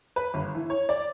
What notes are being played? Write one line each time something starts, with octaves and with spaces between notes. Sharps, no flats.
B4
G1
E3
C#5
D5